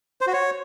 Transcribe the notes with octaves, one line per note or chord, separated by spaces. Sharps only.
C5
F#4
C#5